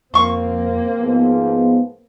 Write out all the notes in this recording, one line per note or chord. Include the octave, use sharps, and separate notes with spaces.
F2 A#3 C4 C6 C#6
G#2 F3 B3